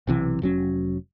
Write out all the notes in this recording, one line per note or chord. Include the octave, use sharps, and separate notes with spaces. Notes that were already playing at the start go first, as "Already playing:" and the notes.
B1 C3 E3
F1 F#3 C#4